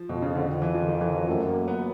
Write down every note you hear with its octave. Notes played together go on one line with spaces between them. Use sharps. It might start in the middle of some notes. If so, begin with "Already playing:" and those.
Already playing: F3
F2 B2
C#3
D3
F2
E3
F3
D#3
E3
F#3
F#2 A3
A#3
B3